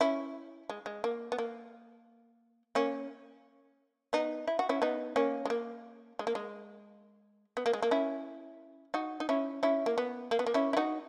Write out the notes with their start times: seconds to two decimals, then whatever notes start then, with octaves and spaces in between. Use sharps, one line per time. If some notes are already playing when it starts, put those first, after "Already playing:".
0.01 C#4 E4
0.69 G#3
0.86 G#3
1.04 A#3
1.32 B3
1.38 A#3
2.75 A#3 C#4
4.13 B3 D#4
4.47 E4
4.59 F#4
4.69 C#4 E4
4.82 B3 D#4
5.16 A#3 C#4
5.45 G#3
5.50 A#3
6.19 G#3
6.27 A#3
6.35 G#3
7.57 B3
7.66 A#3
7.73 G#3
7.82 A#3
7.91 C#4 E4
8.94 D#4 F#4
9.20 D#4
9.29 C#4 E4
9.63 C#4 E4
9.86 A#3
9.98 B3
10.31 A#3
10.39 B3
10.46 A#3
10.54 C#4 E4
10.73 E4
10.77 D#4 F#4